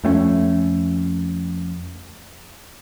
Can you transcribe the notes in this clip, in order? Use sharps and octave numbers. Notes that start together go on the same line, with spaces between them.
F2 A3 C4 C#4